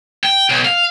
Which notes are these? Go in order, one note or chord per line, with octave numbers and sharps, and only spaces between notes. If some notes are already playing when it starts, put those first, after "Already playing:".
G5
B1
F5